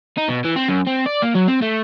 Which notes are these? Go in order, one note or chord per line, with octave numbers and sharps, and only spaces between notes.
D#4
B2
E3
C4
F#2
C4
D5
A#3
F#3
C4
A3